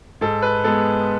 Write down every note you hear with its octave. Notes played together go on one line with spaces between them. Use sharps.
G#2 A4
B4
G#3 B3 A4